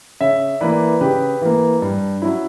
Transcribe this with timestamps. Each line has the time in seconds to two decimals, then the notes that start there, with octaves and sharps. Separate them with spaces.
0.21 C#3 C#5 E5
0.61 E3 A#3 B4 D5
1.01 C#3 G4 B4
1.42 E3 A#3
1.82 G2
2.22 F#3 C#4 E4